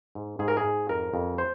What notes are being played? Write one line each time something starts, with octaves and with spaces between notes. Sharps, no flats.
G#2
G#2 G#4
A#4
G#4
G#2
F2 A#4
F2
C5